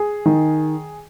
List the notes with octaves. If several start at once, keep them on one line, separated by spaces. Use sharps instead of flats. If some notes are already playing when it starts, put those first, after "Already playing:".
Already playing: G#4
D#3